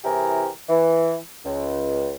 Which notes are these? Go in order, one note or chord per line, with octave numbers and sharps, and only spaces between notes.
C3 E3 E4 G4 G#4 A#4
E3
C#2